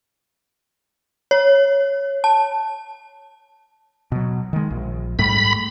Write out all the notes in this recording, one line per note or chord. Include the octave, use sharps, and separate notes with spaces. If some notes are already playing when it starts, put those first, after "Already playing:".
C#5
A5
B2 F#3
D#3 G#3
A#1
G#2 G3 A3 B5